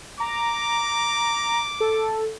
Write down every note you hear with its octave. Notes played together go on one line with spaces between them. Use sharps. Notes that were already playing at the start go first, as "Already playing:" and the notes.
A#5 D6
A4